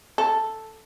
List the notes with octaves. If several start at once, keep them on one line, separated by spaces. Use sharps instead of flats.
A4